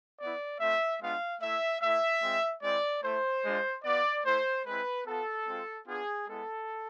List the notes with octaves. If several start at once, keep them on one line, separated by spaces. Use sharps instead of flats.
B3 E4 D5
A3 C4 F4 E5
G#3 B3 D4 F4 F5
A3 E4 E5
A3 E4 E5
G#3 C4 F4
G#3 C4 E4 D5
A3 E4 C5
G#3 D4 F4
B3 F4 D5
A3 E4 C5
G#3 C4 E4 B4
B3 F4 A4
G#3 C4 F4
B3 D4 F4 G#4
G#3 B3 E4 A4